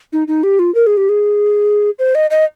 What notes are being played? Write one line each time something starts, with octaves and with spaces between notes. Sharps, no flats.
D#4
D#4
G4
F4
A#4
G#4
G4
G#4
C5
D#5
D#5